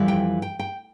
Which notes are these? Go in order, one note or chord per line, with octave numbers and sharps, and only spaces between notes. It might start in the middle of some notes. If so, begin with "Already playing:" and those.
Already playing: F2 E3 G3
G5
G5
G5